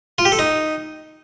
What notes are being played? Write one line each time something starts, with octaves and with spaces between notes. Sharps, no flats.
F4
G4
A4
D#4